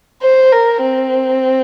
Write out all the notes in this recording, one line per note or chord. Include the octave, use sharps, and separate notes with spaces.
C5
A#4
C4